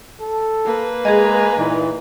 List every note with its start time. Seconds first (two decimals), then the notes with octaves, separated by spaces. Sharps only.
0.21 A4
0.65 A#3 B4
1.05 G#3 G#4 D#5 G#5 A#5
1.58 A#2 E3 D#4